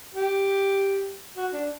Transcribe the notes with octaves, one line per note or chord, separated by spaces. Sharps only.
G4
F#4
D4